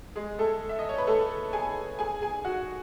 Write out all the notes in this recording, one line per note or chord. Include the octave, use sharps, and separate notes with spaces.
G#3 G#4
A3 A4
E5
D#5
C#5
B4
A3 A4
G#4 G#5
G#4 G#5
G#4 G#5
F#4 F#5